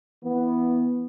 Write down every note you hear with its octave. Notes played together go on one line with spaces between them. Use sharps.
E3 B3